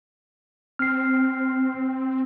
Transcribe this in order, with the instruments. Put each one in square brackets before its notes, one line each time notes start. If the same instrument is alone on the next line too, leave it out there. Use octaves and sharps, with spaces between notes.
[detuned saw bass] C4 [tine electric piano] F6 C7